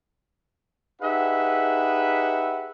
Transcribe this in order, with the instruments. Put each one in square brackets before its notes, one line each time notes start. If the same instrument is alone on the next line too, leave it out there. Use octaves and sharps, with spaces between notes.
[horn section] D#4 G4 G#4 B4 E5 F#5